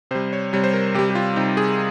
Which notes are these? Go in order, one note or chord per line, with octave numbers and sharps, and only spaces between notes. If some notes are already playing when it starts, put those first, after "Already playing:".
C3 G3 C5
C#5
C3 G3 C#5
C5
A#4
C3 G3 G4
G4
F4
C3 G3 D#4
G#4